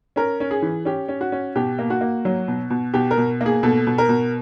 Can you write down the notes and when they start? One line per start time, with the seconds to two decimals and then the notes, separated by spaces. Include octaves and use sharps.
0.16 C#4 A#4
0.40 C#4
0.51 G#4
0.62 E3
0.85 C#4 G4
1.09 C#4
1.21 F#4
1.32 C#4
1.56 B2 G4
1.79 A#3
1.90 F#4
2.01 A#3
2.25 F#3
2.48 B2
2.70 B2
2.94 B2 G4
3.11 A#4
3.18 B2
3.41 A#3
3.46 G#4
3.63 B2 A4
3.87 B2
3.98 A#4
4.09 B2